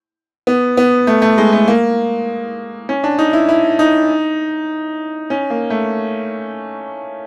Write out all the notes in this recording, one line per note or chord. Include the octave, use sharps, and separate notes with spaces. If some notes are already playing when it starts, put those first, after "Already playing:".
B3
B3
A3
A3
G#3
A3
A#3
C#4
D4
D#4
E4
E4
D#4
C#4
A#3
A3